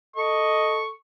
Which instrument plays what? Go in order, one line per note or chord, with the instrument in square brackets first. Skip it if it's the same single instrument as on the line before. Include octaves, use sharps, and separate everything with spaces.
[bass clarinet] A4 [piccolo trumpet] D#5 [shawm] C#6